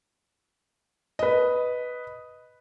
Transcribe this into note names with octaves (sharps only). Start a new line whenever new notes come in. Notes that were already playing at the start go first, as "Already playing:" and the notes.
B4 D#5